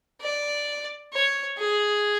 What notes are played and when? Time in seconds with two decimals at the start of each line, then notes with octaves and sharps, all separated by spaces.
0.21 D5
1.13 C#5
1.59 G#4